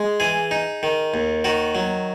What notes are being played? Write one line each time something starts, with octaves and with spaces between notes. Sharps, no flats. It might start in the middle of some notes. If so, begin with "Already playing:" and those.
Already playing: G#3
E3 G#4
D#4
D#3
D#2
D#3 F#4
F#3